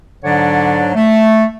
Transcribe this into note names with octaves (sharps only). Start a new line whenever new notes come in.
G#2 D3 F#3 D4 C#5 D5
A3